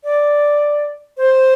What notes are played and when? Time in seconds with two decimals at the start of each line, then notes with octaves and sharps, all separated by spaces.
0.04 D5
1.17 C5